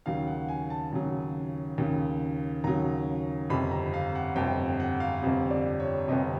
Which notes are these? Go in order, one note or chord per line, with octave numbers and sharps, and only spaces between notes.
D#2 C#3 F#3 F5
F#5
G#5
A5
D#2 C#3 F#3
D#2 C#3 F#3
D#2 C#3 F#3 A#5
G1 F2 C3 B5
A#5
F5
F#5
G1 F2 C3 G5
F#5
F5
G1 F2 C3
D5
C#5
G1 F2 C3 D#5